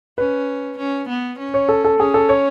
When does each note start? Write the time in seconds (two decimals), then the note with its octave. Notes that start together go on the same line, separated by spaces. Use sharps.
0.18 C#4 B4
0.78 C#4
1.09 B3
1.39 C#4
1.54 C#5
1.69 A4
1.84 A4
1.99 C#4 G#4
2.14 A4
2.29 C#5